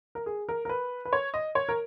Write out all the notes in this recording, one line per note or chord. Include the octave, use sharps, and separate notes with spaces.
A#4
G#4
A#4
A#4
B4
B4
C#5
D#5
C#5
A#4